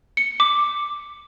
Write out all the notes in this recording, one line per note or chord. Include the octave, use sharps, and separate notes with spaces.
C#7
D6